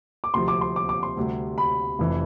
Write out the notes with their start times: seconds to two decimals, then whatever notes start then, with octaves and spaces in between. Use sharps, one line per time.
0.24 D6
0.34 D2 C3 F3 C6
0.48 D6
0.61 C6
0.76 D6
0.89 D6
1.03 C6
1.17 D2 C3 G3
1.58 B5
1.99 F1 F2 E3